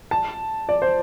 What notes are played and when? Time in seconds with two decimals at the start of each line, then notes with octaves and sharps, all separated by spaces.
0.11 A5
0.69 D5
0.82 C5